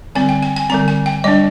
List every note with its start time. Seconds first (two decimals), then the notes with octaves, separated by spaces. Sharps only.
0.15 D3 G3 C4 G#5
0.29 G5
0.43 G#5
0.57 G#5
0.70 D3 G3 C4 A#5
0.88 G#5
1.06 G5
1.24 G3 D4 D#5